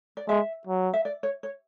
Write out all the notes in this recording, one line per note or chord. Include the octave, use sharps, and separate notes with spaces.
D5
G#3 E5
F#3
E5
D5
C#5
C#5